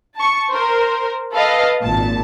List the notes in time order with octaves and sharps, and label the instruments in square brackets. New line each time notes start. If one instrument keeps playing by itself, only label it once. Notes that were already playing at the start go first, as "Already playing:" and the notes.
[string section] A5 C#6
A#4 C5
A4 B4 D#5 F5
G#1 A#2 A5